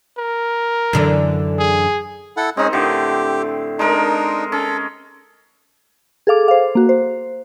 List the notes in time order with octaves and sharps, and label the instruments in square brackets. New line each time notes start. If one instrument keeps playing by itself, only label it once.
[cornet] A#4
[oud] F#2 D3 E3
[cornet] G#4
[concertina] E4 A4 F#5
[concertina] G#3 C#4 G#4 [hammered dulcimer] C4 D#4
[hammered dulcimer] A2 D3 [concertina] G4
[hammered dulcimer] G#3 A#4 [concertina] D4 D#4
[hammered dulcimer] C#4 [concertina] A4
[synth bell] G#4 A4 F5 D6
C5 F5
A#3 F#4
C5